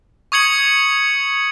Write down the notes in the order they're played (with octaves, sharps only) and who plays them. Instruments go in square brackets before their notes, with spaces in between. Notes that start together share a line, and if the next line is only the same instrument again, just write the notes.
[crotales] C#6 D#6 G#6 C#7 F#7